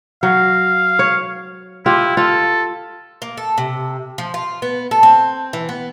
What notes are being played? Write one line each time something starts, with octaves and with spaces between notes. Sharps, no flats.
F#3 F5
C#5
E4 F4 G4
F4 A4
A#3
A4
C3
F3
F4
B3
A4
C4
E3
B3